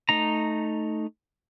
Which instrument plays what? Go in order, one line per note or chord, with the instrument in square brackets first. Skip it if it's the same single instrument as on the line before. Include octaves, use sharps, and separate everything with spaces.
[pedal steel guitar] A3 D#4 A#5